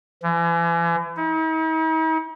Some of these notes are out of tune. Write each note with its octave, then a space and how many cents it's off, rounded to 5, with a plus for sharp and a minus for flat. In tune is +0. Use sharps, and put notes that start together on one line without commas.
E3 +40
D#4 +45